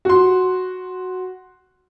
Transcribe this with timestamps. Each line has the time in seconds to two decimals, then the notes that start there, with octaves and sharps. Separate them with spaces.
0.05 F#4 C6